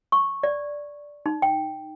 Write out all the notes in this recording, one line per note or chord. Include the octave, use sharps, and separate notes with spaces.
C#6
D5
D#4
G5